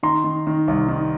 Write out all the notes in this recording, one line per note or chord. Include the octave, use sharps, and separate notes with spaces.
D#3 A#5 C6
D#3
D#3
C2
D#3